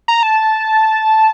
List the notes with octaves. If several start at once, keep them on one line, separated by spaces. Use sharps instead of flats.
A#5
A5